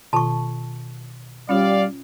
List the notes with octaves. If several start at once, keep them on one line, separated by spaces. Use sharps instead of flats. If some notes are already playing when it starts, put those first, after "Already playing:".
B2 D#3 F4 A5 C#6
G3 C#4 F4 C#5 D5 F5